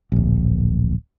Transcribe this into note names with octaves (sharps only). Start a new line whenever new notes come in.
D1 A#1